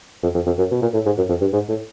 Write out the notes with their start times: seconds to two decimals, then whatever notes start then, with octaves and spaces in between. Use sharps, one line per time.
0.23 F2
0.35 F2
0.47 F2
0.59 F#2
0.71 B2
0.82 A#2
0.94 A2
1.06 G#2
1.18 F#2
1.29 F2
1.41 G2
1.53 G#2
1.69 A2